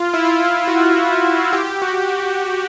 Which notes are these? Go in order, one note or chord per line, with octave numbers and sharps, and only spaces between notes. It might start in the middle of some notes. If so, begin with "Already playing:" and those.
Already playing: F4
E4
F4
F#4
G4
F#4